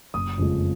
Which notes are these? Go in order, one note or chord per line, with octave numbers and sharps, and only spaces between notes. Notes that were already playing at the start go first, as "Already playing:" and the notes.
F#1 D#6
F2 C#3 F3 G#3